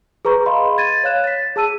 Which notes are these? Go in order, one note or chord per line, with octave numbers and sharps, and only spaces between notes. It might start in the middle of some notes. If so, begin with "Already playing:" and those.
G#4 B4 A#5 C#6 G6
D#5 F5 B5 C6
G#6 A6 D#7
C#5 F5 F#6 E7
A6 B6
G#4 A5 E6 D#7